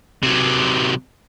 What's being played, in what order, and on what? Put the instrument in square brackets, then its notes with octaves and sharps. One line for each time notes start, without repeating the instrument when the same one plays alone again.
[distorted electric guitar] C3 F#3